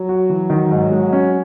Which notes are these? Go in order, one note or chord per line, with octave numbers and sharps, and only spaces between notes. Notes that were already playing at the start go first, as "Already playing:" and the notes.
Already playing: F#3
F#4
E3
D#3
G#2
G#3
C#4